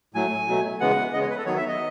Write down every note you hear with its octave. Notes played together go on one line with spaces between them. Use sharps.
A2 F#3 A3 G#5
B2 F#3 A3
C#3 E3 G#3 B3 F#5
C#3 G#3 B3 D#5
C#5
B4
A4
D#3 F#3 B3 C#5
E5
D#5